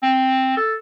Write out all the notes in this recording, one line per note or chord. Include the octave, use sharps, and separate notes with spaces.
C4
A4